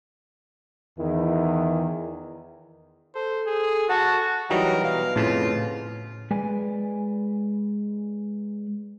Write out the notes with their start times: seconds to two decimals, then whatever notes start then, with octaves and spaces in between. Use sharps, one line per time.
0.98 E2 D#3 E4
3.15 A4 C5
3.47 G#4
3.89 F#4 F#5 A5
4.50 E3 F#3 G3 D#4 A#4
4.84 B2 F5
5.16 F2 A2 C#3 F4
6.31 G#3 B4 D5 G#5